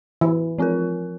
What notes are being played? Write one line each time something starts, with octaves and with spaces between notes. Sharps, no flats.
E3
F3 C4 F4 A#4